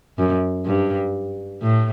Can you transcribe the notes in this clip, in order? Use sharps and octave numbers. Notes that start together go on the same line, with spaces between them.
F#2
G2
A2